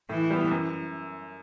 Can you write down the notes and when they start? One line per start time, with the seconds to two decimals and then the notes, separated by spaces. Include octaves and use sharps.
0.09 A2 E3
0.31 G3 B3
0.51 F#2